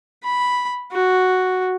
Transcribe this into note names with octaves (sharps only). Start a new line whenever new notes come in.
B5
F#4